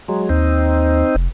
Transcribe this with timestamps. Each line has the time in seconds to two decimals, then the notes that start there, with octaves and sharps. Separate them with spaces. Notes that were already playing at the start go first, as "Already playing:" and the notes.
0.08 F#3 G#3
0.29 D#2 C4 D#4
1.15 F1